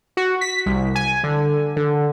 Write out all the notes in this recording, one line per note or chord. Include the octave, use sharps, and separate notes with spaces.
F#4
B6
C2
G#5
D3
D3